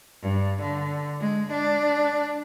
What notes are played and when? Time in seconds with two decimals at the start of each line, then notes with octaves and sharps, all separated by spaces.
0.22 G2
0.61 D3
1.20 G#3
1.52 D4